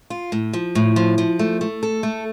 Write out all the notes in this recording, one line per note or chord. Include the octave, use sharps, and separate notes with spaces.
F4
A2
F3
A2
F3
F3
A3
A3
A4
A3